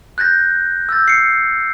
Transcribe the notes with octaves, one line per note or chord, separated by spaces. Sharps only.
F#6 G6 A6 A#6
E6 G6 A6
C7 C#7